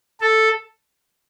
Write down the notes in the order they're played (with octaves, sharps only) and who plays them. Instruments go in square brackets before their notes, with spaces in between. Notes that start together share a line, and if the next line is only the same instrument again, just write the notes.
[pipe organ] A4